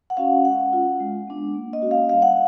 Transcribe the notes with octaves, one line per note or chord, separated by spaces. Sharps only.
F#5
C#4 F#4 F5
G#3 F#5
C#4 F4
G#3
B3 D4
A#3
D#5
C#4 F#4
F5
G3 F5
F#5